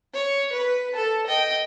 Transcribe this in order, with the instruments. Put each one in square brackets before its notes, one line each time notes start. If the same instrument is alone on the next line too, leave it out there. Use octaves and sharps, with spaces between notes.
[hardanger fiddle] C#5
B4
A4 A5
D#5 G5